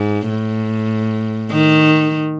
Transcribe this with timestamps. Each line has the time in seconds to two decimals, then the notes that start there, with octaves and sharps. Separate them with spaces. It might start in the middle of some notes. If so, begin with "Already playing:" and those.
Already playing: G#2
0.29 A2
1.51 D#3